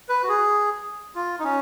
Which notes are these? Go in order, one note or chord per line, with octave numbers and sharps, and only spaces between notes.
B4
F#4
G#4
F4
D#4
C#4